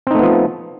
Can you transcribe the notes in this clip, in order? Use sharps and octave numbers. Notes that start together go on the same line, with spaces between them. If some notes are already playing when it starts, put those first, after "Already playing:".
F3 A3 B3 C4 D#4